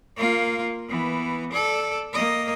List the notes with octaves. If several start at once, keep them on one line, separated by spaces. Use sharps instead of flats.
A#3 F4
E3 B3
A4 D5
A#3 D#5